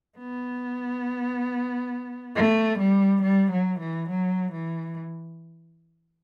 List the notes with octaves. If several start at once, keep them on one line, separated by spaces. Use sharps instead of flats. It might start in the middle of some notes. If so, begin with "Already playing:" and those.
B3
A3
G3
G3
F#3
E3
F#3
E3